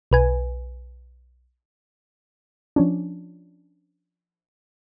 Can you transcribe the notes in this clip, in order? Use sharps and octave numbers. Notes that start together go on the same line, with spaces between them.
B1 B4 G#5
F3 C#4 D4